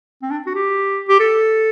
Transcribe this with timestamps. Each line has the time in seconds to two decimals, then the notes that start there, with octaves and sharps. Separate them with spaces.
0.23 C4
0.31 D4
0.47 F#4
0.55 G4
1.09 G4
1.20 A4